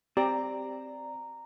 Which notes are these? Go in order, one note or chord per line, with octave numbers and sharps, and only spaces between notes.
C4 G4 D5 A#5